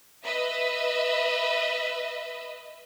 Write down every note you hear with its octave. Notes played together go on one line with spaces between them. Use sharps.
B4 D#5 E5